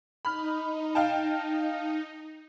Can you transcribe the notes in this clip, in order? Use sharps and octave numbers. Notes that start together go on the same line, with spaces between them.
D#4 B5 F6
F5 G5 A5